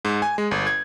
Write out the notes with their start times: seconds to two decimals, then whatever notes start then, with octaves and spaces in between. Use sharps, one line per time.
0.05 G#2
0.22 G#5
0.38 G#3
0.51 G1
0.67 G#6